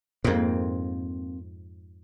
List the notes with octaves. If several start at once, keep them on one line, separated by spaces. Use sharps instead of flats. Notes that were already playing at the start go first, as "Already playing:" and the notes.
F2 G#2 A#3 C4